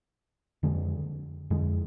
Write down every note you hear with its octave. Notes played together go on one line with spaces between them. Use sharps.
F2 D3 G#3
F2 D3 G#3